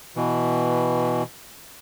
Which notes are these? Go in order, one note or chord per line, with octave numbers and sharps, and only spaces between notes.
B2 E3